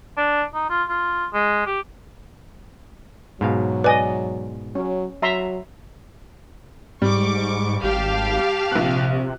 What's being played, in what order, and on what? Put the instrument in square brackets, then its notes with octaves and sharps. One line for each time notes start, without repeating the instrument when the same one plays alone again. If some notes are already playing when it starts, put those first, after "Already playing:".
[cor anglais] D4
D#4
F4
F4
G#3
G4
[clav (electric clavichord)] G#2 B2 F5 [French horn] F#3
[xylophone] B4 G#5 [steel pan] D5 D#5
[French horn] F#3 [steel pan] C#4
[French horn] F#3 [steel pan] E5 A#5 C6
[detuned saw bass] G#2 [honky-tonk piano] G3 [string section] C#6 D6
[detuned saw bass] G#1 [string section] G4 F5 A5
[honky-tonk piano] A#1 F#6 [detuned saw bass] C3